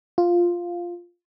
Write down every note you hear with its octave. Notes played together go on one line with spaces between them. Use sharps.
F4